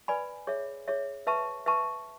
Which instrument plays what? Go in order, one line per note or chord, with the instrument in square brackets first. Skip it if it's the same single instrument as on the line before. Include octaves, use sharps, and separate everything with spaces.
[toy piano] B4 D5 G#5 B5
G#4 C#5 E5
G#4 C#5 E5
B4 E5 A5 C#6
B4 E5 A5 C#6